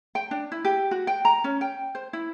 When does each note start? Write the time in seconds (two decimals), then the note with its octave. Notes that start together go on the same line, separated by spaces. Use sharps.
0.15 G5
0.31 D4
0.52 E4
0.65 G4
0.91 F#4
1.07 G5
1.25 A#5
1.44 C#4
1.61 G5
1.95 C5
2.13 E4